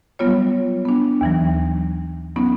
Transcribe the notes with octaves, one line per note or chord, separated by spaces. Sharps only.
F#3 G3 B3 F4 C#5
B3 D4
D#2 E3 F#3
F#3 B3 C#4 D#4